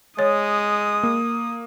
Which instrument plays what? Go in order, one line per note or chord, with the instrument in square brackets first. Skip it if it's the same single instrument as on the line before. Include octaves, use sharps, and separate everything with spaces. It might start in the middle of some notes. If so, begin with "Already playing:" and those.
[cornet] G#3 [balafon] C#5 [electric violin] D#6
[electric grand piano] A#3